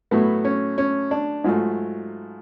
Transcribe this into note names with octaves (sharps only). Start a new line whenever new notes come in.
A2 F#3 A3 B3
C#4
C#4
D4
G#2 F#3 A3 F4